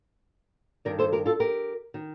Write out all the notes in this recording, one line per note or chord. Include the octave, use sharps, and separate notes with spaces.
G2 D#3 A#4 D5
A4 C5
G4 A#4
F4 A4
G4 A#4
D#3